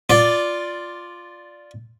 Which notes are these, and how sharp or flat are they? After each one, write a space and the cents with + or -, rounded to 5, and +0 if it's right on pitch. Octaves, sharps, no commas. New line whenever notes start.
F4 +0 D5 +0